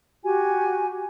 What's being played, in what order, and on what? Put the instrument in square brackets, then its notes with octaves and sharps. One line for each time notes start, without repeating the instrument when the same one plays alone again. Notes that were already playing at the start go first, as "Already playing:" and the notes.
[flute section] F#4 G4 G#5